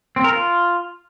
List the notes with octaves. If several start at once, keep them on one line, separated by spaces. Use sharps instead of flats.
C4
A#4
F4